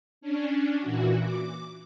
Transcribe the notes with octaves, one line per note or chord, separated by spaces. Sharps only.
C#4 D4
A#2 E3 F#4
D6